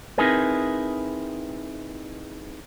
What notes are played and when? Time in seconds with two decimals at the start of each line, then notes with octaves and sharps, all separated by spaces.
0.18 C4 D#4 E4 G#4 A#4 B4